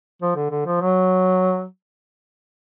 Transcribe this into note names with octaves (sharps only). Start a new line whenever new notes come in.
F3
D3
D3
F3
F#3